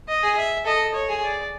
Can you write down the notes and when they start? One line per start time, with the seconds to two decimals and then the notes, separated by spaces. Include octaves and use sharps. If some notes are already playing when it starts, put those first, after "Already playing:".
0.08 D#5
0.23 G#4
0.37 E5
0.65 A4 D#5
0.94 C#5
1.09 G#4
1.23 D5